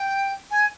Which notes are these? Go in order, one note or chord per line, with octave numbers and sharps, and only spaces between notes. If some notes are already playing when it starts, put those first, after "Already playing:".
Already playing: G5
G#5